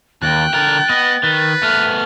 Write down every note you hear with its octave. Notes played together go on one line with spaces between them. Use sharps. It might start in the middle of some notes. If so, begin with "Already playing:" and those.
D#2 G5 F#6 A6
D3 A#4 A6
B3 D#5
D#3 B4
A3 B3 F6